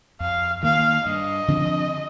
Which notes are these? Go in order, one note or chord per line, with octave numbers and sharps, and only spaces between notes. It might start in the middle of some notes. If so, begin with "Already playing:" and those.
F2 F5
D#3 A#3 F5
G2 D#5
D3 F3 C4